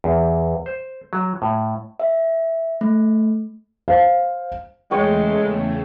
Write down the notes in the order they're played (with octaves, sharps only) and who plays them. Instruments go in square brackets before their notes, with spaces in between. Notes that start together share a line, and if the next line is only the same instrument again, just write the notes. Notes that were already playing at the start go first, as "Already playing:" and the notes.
[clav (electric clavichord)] E2
C5
F#3
A2
[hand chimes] E5
A3
[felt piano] C5 F5
[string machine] E2 C#3 A3 [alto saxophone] G#3 [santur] C#5 G5